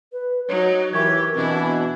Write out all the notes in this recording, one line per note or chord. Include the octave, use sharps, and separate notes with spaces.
B4
F#3 D#4 C#5
E3 G4 A#4 C#6 G#6
B2 E3 C4 D4 E4